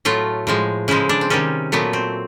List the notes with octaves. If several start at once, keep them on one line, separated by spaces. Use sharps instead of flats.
A2 F#3 A3 F4
A2 F3 G#3
C#3 F3 G#3 E4
D4
C4
C3 D#3 G3 C#4
A#2 F#3 A3 B3
C4